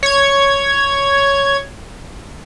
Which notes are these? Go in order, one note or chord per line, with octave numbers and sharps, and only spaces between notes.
C#5 G#6